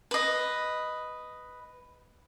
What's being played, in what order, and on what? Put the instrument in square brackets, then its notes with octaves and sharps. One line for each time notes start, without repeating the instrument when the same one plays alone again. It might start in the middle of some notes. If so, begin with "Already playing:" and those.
[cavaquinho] B4 D#5